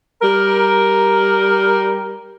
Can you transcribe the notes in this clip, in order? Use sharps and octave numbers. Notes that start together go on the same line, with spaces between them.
G3 A#4